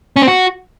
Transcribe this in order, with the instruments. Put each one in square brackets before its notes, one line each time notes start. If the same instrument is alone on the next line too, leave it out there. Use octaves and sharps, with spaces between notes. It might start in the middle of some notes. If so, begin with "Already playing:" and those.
[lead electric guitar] C#4
C4
F#4